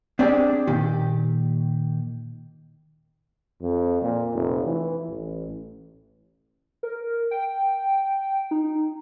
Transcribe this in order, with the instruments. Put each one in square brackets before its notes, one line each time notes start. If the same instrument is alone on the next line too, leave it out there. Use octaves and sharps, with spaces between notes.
[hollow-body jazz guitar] C4 D4 G4 G#4 D5
A#2 D#3 G4
[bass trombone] F2
A#2
F1
E3
A1
[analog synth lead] A#4
G5
D#4